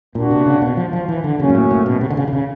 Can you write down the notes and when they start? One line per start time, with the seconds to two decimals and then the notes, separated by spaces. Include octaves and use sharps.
0.15 A#2 A#3 D4 F#4
0.31 C3
0.46 C#3
0.62 B2
0.77 F3
0.93 F3
1.08 E3
1.24 D3
1.39 C#3 F#3 A#3 C#4
1.49 G#2
1.55 A2
1.71 A2
1.86 B2
2.01 C3
2.10 D3
2.17 C#3
2.28 D3
2.33 C#3